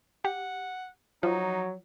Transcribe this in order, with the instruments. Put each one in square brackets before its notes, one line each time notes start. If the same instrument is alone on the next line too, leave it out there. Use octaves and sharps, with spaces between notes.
[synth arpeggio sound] G4 [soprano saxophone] F#5
[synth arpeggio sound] F3 [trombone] F#3 [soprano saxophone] D#4